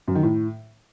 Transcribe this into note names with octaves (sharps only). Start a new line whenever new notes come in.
F#2
D#3
A2